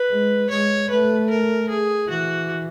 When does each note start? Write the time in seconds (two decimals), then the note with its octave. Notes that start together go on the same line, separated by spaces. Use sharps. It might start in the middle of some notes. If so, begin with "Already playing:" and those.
Already playing: B4
0.10 G#3
0.49 G#3 C#5
0.89 A3 B4
1.30 A#4
1.69 G#4
2.09 E3 F#4